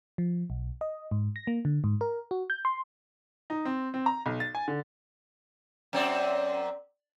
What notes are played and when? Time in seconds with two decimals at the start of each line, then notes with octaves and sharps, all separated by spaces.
0.18 F3
0.50 B1
0.81 D#5
1.11 G#2
1.36 A#6
1.47 A#3
1.65 D3
1.84 G#2
2.01 A#4
2.31 F#4
2.50 G6
2.65 C6
3.50 D#4
3.65 C4
3.94 C4
4.06 A#5
4.26 B1
4.40 A6
4.55 G#5
4.68 D3
5.93 F#2 C4 D5